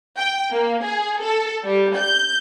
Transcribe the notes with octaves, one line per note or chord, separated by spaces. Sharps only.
G5
A#3
G#4
A4
G3
G6